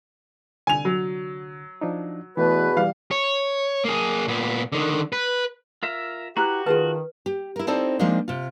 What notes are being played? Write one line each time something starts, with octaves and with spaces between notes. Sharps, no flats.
C2 D3 G#5 F7
F#3
F3 D4 D#4
E2 B2 E3 A3 B4
E3 G3 F5
C#5
A#3 G#4
A#2 B3
D3 D#3
B4
F4 A#4 E5
E4 F#4 G4 B4 A#5 F#6
D#3 F4 G#4 B4 A5
G4
E4 A#4
C4 D#4 E4 A4 C5 D5
F3 G#3 A#3 C4 D4 D#4
C3 F4